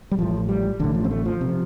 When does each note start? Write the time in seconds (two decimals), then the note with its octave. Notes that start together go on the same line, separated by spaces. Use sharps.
0.11 G3
0.19 A1 A2 F3
0.49 G3
0.80 A1 A2 D3
0.95 F3
1.05 C4
1.11 A3
1.25 F3
1.41 C3